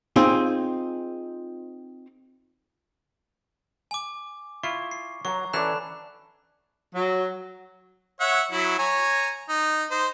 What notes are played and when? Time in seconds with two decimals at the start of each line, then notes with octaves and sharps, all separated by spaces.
0.16 C4 D#4 F4 G#4 C5
3.91 G#5 D6
4.63 E4 F4 C#6
4.91 C7
5.25 F#3 F#5 A#5 C#6
5.53 E3 C#4 D4 A4 D5 B5 F#6 E7
6.94 F#3
8.21 C#5 E5 F#5
8.51 F#3 E4
8.79 C#5 G#5 A#5
9.49 D#4
9.91 D#4 C5